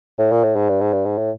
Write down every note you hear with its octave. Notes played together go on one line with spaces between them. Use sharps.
A2
A#2
A2
G#2
G2
G#2
G2
G#2
A2